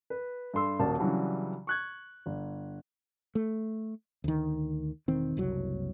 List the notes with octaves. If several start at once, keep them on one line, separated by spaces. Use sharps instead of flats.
B4
G2 A4 C6 E6
D#1 A#3 F#4 A5
C#3 E3 F#3 G3 D4
C#6 F#6 G#6
G1
A3
D2 D#3
E1 D#3 C4
F#1 C2 F#3